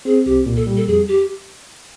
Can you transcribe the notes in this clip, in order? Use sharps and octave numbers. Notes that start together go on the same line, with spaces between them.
C4 G#4
C2 G4
A#2
A4
G3
A4
F2 G#4
G4